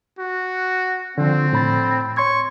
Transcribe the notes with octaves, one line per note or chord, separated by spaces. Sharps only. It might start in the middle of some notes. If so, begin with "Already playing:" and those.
F#4
D3 F3 C4
A2 B5 A6
C#5 C6 C#6 G#6